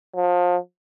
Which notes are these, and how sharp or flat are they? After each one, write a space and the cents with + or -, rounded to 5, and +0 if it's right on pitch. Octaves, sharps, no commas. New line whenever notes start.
F3 +30